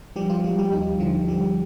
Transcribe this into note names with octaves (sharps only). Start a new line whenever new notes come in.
F3 G3 G4
F3 F4
F3 G3 G4
G3 G4
D#2 D#4
D3 F3 F4
F3 G3 G4